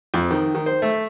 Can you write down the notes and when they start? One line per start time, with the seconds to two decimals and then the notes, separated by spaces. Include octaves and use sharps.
0.14 F2
0.31 D#3
0.55 D#3
0.66 C5
0.82 A3